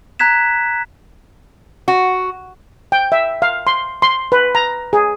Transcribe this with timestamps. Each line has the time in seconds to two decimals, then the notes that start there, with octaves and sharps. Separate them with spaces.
0.19 A#5 F#6 G#6 B6 E7
1.88 F#4
2.92 G5
3.12 E5
3.42 F5
3.67 C6
4.02 C6
4.32 B4
4.55 A#5
4.93 G#4